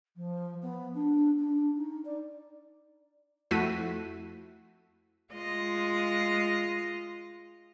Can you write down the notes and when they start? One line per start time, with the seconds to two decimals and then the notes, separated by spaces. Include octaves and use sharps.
0.16 F3
0.62 B3
0.94 D4
1.39 D4
1.76 D#4
2.05 D5
3.51 F2 A3 E4 F#4 B6 D#7
5.34 G#3 F4 D#5